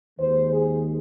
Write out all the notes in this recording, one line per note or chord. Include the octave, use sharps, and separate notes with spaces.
D#2 D#3 G#3 C5
G#4